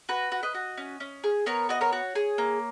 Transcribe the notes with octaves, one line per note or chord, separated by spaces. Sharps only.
F#4 B4
F#4
B4 D#5
F#4
C#4
C#4
G#4
B3 A#4 C#5
F#4 D#5
A#4 C#5
F#4
G#4
A#3